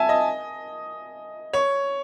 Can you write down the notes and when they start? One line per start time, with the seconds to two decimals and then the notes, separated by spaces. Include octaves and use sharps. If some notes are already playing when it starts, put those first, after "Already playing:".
Already playing: E5 G#5 A5
0.09 D#5
1.53 C#5